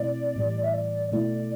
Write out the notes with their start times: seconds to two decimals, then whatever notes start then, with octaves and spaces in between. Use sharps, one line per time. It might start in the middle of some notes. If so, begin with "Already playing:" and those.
Already playing: B2 A3 C4 E4 D5
0.36 A2 E3 G3
0.64 E5
0.74 D5
1.12 B2 A3 E4 D5